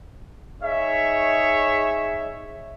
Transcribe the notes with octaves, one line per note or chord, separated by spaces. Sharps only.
D#4 G#4 C#5 E5